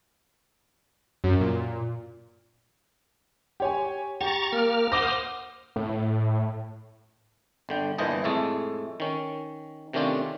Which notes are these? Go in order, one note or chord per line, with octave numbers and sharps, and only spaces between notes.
F#2
A#2
G4 C#5 G#5
G4 A#5 C#6 A6
A#3 A#4 F6
C5 F#5 D6 D#6 F6 A#6
A2
G1 D3 G5
G1 A#2 E3 C5 D#5 A5
F2 A2 G#3 A3 A5
D#3 C#4
C3 D#3 A3 C#4 D4 F4